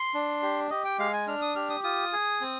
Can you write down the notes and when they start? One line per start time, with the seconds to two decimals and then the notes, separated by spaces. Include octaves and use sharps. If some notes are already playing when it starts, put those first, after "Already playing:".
Already playing: C6
0.14 D4
0.43 G4
0.70 G4 D#5
0.85 G5
0.98 G#3 F5
1.13 G#5
1.27 D4 F6
1.41 D#6
1.56 G4 F6
1.70 D#6
1.84 F4 D#6
2.12 G#4
2.41 C4